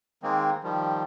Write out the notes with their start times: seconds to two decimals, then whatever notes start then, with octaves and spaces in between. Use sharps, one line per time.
0.23 D#3 G#3 A#3 C4
0.63 D#3 F3 G3